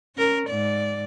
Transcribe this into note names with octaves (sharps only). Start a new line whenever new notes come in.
C#4 A#4
G#2 D5